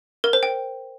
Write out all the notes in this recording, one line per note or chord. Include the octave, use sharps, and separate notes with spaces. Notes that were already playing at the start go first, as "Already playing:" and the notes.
A#4
C5
G5